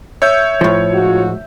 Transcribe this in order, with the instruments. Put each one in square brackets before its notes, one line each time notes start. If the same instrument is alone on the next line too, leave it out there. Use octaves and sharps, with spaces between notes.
[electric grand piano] C#5 G6 [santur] E5
[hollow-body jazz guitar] A2 F3
[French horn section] G#2 F4 F#4